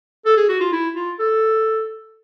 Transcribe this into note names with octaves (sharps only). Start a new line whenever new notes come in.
A4
G#4
F#4
F4
E4
F4
A4